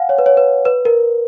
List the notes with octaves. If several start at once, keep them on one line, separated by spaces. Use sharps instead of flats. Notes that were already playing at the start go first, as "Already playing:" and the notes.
Already playing: F5 F#5 G#5
C#5
B4
C#5
B4
B4
A#4